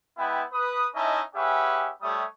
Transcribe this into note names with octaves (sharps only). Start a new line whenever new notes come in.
G#3 B3 E4 B4 G5
B4 D#6
C#4 D#4 E4 D#5 E5 A5
C#4 G4 G#4 B4 E5 F#5
G3 A3 G4 C#5 E5 D#6